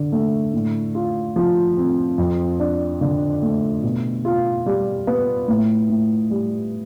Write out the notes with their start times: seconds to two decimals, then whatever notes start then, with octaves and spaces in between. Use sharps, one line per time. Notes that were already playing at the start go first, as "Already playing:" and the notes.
Already playing: D3
0.12 A3
0.53 A2
0.95 F4
1.36 F3
1.77 C4
2.18 F2
2.60 D4
3.01 D3
3.42 A3
3.83 B2
4.25 F4
4.66 G3
5.07 B3
5.48 A2
5.90 A2
6.31 G3